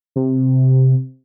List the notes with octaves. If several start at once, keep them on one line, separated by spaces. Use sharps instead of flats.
C3